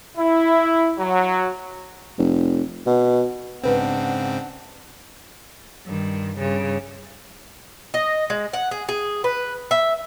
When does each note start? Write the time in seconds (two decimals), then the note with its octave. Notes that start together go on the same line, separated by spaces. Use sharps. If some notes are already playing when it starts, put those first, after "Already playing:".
0.18 E4
0.99 F#3
2.18 F1
2.86 B2
3.64 B1 G#2 C#3 B3 C4 D4 F#5
5.86 G2 D#3
6.38 G2 C#3
7.94 D#5
8.30 G#3
8.53 F#5
8.71 G#4
8.89 G#4
9.24 B4
9.71 E5